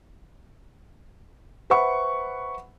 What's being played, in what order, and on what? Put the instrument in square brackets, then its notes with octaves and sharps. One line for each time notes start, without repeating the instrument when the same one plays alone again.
[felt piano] B4 C5 E5 F#5 B5 C#6